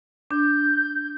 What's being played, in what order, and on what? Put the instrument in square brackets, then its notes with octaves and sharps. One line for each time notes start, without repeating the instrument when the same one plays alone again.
[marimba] D4 [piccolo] G6